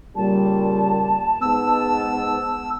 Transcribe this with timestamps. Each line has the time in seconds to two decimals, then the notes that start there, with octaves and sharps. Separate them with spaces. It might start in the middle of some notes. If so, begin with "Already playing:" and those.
0.16 A#2 C#3 G3 A5
1.42 G#2 G#3 B3 E6